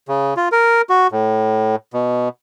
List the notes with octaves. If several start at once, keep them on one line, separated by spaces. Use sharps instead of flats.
C#3
F4
A#4
F#4
A2
B2